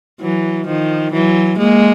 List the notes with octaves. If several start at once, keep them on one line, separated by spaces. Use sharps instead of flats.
E3 F#3
D#3 F3
E3 F#3
G#3 A#3